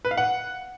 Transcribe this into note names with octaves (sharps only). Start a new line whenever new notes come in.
B4
F5
F#5